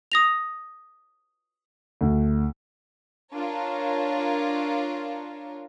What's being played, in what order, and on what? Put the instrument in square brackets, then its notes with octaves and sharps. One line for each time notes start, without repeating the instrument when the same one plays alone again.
[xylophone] D#6 A#6 F7
[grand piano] D2
[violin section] D4 F4 A#4 C#5